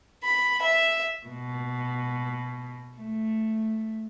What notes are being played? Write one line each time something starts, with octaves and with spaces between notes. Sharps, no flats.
B5
E5
B2
A3